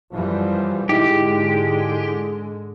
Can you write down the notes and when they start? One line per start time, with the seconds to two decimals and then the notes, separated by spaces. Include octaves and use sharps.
0.13 F#2 E3 F3 G3
0.89 G#2 D3 G#3 D#4 E4 G4 G#4